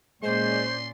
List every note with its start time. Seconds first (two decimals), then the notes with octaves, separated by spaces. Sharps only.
0.23 A#2 G#3 C#4 C5 D5 C6